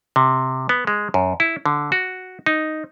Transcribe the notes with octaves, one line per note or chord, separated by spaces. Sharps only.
C3
B3
G#3
F#2
E4
D3
F#4
D#4